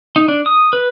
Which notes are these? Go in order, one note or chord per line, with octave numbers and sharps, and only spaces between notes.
D#4
D4
D#6
B4